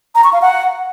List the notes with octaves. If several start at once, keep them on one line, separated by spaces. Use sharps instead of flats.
A#5
C#6
F5
F#5